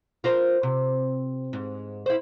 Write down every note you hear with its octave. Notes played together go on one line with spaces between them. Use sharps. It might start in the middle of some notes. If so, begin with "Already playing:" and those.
F4 A#4 C5
C3
G#2
E4 C5